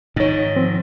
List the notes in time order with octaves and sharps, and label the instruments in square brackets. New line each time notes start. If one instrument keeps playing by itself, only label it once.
[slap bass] G#2 D#3 [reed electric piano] D#4 C#5
[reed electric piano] F3 C4